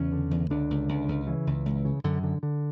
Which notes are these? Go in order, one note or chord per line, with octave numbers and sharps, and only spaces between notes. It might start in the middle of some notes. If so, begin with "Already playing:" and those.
Already playing: E2 C#3 C#4
D3
E2
C#2 D3 D4
C#2
C#2
C#2
C#3 E3
C#2
C#2
C#3
F#2 D3
D3
D3